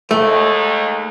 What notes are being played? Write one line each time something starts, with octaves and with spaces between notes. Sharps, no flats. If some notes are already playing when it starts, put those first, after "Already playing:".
D#2 G#3 A3